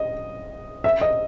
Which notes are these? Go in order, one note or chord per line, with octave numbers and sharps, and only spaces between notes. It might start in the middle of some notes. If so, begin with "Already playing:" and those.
Already playing: D#5
E5
D#5